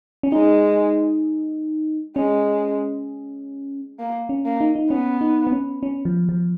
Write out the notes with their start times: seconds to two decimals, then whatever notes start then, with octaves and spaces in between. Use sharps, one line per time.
0.23 C#4
0.32 G#3 D#4
2.16 G#3 C#4
3.99 A#3
4.29 C#4
4.45 A#3
4.61 D#4
4.75 D#4
4.90 B3 C#4
5.21 D#4
5.47 B3
5.52 C#4
5.83 C#4
6.05 F3
6.29 F3